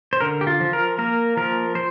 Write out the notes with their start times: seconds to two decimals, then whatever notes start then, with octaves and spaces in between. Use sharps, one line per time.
0.13 C5
0.21 D3 A#4
0.41 G4
0.47 F4
0.60 F3
0.73 A#4
0.98 A#3 A#4
1.37 F3 A#4
1.75 C5